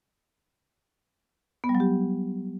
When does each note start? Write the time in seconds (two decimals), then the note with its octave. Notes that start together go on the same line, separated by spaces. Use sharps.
1.64 B3
1.69 G3
1.75 F#3
1.80 G4